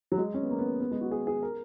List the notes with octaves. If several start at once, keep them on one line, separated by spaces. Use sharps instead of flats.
F#3
G#3
C#4
B3
A#3
B3
B3
G#3
F#4
G#4
G#4
A#4